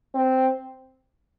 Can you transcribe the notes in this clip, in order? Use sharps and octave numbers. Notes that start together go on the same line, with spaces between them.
C4